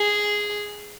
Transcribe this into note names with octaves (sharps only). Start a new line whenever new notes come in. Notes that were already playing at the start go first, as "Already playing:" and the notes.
Already playing: G#4